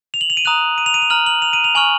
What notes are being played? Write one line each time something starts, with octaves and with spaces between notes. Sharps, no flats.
F7
F#7
F7
D#7
A#5 D#6 F#6 F7
D#7
F7
D#7
F7
A#5 F6 F#7
F#7
F7
D#7
F7
G#5 C#6 F6 F#7